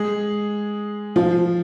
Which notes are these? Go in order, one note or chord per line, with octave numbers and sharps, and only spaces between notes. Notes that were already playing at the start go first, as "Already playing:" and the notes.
Already playing: G#3 G#4
F3 F4